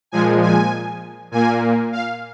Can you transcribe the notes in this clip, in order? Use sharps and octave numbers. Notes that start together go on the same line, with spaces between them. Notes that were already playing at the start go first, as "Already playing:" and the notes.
A#2 F3 G#3 G#5
G#5
A#2 A#3 G#5
F5